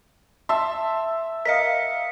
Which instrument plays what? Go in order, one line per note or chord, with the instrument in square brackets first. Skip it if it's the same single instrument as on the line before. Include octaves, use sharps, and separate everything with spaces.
[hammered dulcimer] E5 [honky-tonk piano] A5 C6
[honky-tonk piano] A#4 D#5 F5 [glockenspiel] B6 C#7